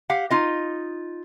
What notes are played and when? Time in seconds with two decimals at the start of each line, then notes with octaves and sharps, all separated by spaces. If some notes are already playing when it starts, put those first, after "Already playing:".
0.10 G4 F5 F#5
0.30 D#4 F4 D#5